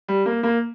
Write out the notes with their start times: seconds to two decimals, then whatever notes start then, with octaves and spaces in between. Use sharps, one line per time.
0.08 G3
0.26 A#3
0.43 A#3